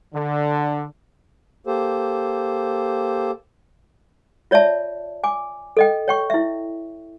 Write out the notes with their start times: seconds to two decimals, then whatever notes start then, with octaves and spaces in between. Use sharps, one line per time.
0.14 D3
1.67 A#3 G4 A4 C5
4.51 F4 C#5 D5 E5 A5
5.24 G#5 D6
5.77 A4 D#5 G5
6.08 C#5 G5 C#6
6.30 E4 E5